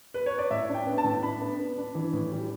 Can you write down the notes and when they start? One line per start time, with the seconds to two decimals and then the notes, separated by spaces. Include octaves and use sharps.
0.14 B4
0.26 C#5
0.38 D5
0.51 A2 E5
0.69 D4
0.74 G5
0.86 B3
0.98 A5
1.04 A2
1.22 D4 B5
1.41 B3
1.58 B3
1.77 D4
1.95 E3
2.13 A2
2.32 G3